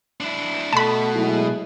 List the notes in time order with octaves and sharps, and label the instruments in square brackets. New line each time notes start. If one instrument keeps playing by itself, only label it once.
[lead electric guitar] D4 E4
[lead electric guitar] B2 [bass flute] A3 [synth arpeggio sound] A5 B5
[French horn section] F#3 G#3 E4